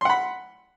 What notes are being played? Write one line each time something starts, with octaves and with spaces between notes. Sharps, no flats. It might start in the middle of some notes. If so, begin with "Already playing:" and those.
F#5 B5 C6